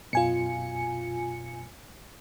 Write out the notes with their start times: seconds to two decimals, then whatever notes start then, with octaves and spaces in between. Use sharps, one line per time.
0.13 F#2 B2 F4 G#5 C#7